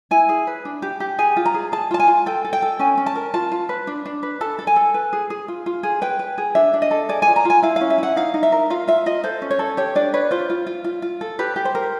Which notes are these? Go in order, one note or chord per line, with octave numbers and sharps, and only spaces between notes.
E4 G#5
G#4
B4
D4
G4
G4
G#4 G#5
F4
A#5
G#4
G#4 A5
F4 A5
G#5
F4
A4 G5
A4
G5
A4
C#4 G#5
C#4
A5
A#4
F4 A5
F4
B4
D4
D4
B4
A4 A5
A4
G#5
A4
B4
G#4
G#4
F4
F4
G#4
B4 G5
B4
G#4
D4 E5
D4
D#5
A4
G#4 D5
G#5
F4
A#5
F4 G#5
E4 F5
F5
C#4
E5
E4 F#5
D#4 F5
D#4
E5
A#4
F4 F5
F4 E5
F4 D#5
A4 C5
C#4
C#5
A4
G4 C#5
D4 D5
B4 C#5
F4 C5
F4
F4
F4
F4
A4
G4 B4
G4
C5
A#4